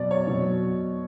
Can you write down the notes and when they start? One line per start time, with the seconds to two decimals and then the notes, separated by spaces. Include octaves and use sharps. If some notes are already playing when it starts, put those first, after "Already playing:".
Already playing: B2 F#3 D5
0.11 C#5
0.27 B2 F#3